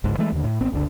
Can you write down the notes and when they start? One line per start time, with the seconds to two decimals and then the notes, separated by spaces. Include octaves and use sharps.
0.04 G1 C#2 G#2
0.18 E3 G#3 A3
0.32 D#2 D3
0.44 A2
0.61 G#1 B3 C4
0.72 F#1 C#2 D3 D4